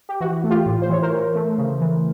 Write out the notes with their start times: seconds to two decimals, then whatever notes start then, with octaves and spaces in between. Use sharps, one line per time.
0.09 G4
0.21 E3 F#4
0.44 A3
0.50 F4 G4
0.66 A2
0.82 C5
0.89 E3 C#5
1.03 A#4 C5
1.12 E3
1.35 A3
1.58 C#3
1.81 E3